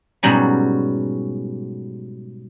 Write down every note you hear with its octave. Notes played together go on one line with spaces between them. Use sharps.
G#2 B2 F#3 G3 C#4